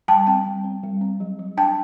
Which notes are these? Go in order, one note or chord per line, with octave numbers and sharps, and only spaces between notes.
G3 G5 A5
C4 G5 A5
G3
C4
G3
C4
F#3
F#3
D4 G5 A5